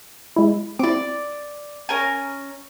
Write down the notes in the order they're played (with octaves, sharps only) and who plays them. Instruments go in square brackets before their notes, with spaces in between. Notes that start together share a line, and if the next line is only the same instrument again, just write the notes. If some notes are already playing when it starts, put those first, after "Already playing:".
[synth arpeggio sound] G#3 E4
[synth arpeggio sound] C4 E4 [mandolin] D5 D6
[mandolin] C#4 A#4 G#5